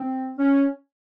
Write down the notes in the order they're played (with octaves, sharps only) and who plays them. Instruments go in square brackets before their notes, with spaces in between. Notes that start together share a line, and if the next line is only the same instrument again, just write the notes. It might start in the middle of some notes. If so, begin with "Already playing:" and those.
Already playing: [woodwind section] C4
C#4